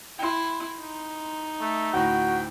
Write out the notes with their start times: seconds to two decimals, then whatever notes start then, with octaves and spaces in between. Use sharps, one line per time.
0.19 E4 G5 C6
0.80 D#4
1.61 A3
1.94 D2 A2 F#4 G5